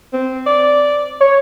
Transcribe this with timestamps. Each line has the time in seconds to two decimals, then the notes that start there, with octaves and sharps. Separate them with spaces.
0.14 C4
0.46 D5
1.20 C#5